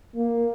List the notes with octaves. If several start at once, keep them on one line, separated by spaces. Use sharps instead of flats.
A#3